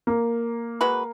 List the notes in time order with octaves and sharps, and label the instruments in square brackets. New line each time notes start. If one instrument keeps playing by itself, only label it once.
[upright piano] A#3
[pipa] G#3 F#4 B4